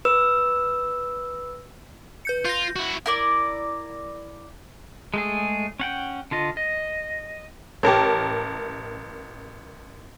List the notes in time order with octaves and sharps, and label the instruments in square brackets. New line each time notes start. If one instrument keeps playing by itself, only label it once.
[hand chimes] B4 E6
[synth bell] B4 G6 C#7
[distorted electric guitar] F4 [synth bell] G6 A#6
[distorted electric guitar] E4 F#4
[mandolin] E4 A#4 D5
[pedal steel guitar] G#3 A3 G#4
C#4 F#5 G5
D3 F4 D#5
D#5
[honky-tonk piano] A1 A#4 A5 [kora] G4 C#5